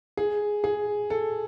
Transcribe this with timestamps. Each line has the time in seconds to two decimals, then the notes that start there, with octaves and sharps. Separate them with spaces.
0.17 G#4
0.64 G#4
1.10 A4